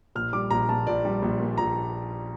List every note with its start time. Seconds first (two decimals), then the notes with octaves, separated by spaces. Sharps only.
0.15 A#1 F6
0.33 G3 D6
0.51 A#1 A#5
0.69 A#2 A5
0.87 A#1 D5
1.05 G3
1.22 A#1
1.40 A#2
1.58 A#1 A#5